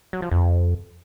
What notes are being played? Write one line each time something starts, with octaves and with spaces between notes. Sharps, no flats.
F#3
F3
F2